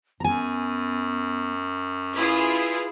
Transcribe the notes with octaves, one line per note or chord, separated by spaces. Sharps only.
F#2 B3 G#5 A#5
E4 F4 G#4 B4